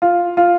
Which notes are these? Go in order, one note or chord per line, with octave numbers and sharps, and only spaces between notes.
F4
F4